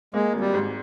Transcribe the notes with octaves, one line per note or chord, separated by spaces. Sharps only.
G#3 A#3
G#1
G3
G#2